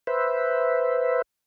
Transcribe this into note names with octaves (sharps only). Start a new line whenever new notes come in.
B4 C5 E5